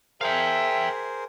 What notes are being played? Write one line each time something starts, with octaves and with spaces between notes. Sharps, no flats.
G#4 A#4 C5 E5 F5 G5